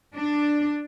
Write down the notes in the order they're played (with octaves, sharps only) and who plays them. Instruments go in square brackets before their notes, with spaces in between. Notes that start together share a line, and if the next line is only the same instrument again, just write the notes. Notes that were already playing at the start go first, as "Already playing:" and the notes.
[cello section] D4